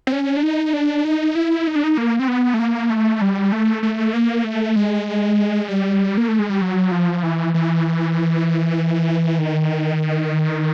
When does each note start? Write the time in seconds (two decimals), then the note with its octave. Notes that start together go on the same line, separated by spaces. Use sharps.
0.07 C4
0.12 C#4
0.36 D4
0.43 D#4
0.73 D4
1.05 D#4
1.35 E4
1.67 D#4
1.76 D4
1.84 D#4
1.98 A#3
2.19 C4
2.28 B3
2.54 A3
2.59 A#3
2.90 A3
3.21 G3
3.52 A3
3.83 A3
4.13 A#3
4.44 A3
4.76 G#3
5.68 G3
6.17 A#3
6.28 A3
6.39 G#3
6.49 G3
6.61 F#3
6.92 F3
7.23 E3
7.54 E3
9.38 D#3